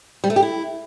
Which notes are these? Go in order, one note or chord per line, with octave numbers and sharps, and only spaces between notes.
G3
A3
G4
E4